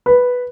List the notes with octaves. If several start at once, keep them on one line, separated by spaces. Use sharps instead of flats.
B4